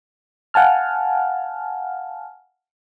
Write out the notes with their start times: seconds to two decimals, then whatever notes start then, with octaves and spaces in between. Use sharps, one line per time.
0.54 F5 F#5 G#5 A5 F6